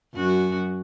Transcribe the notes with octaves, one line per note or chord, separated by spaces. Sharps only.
F#2 F#4